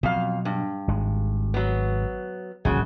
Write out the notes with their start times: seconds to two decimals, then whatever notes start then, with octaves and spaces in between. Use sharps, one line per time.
0.03 F2 B2 F#3 F5
0.45 G2
0.88 G#1 G#3
1.54 F#3 B3
2.65 D1 A#1 C#3 G3 F#4